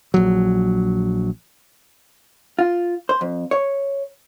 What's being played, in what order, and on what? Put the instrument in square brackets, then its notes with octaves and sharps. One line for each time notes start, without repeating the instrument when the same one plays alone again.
[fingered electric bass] A#1 F#3
[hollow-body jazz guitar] F4
C5
F2
C#5